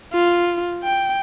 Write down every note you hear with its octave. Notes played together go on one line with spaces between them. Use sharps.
F4
G5